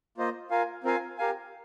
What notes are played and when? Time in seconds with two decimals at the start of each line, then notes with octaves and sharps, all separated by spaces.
0.18 A#3 F4 C5 D#5
0.50 F4 A#4 F5 G#5
0.84 C4 F4 A#4 F5 G#5
1.18 G4 A#4 F5 G#5